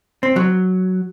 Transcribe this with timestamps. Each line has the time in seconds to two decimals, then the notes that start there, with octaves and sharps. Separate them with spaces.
0.23 C4
0.36 F#3